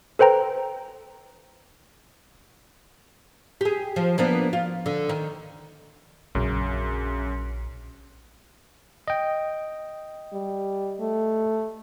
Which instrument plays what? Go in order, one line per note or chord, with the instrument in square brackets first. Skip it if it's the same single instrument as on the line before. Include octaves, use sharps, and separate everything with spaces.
[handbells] A4 B4 C5 G5 A#5
[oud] G4 G#4
F3
A#3 B3 D4
F4
D3
D#3
[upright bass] A#1 [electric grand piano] F#2 C#3
[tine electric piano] D#5 G5
[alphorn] G3
A3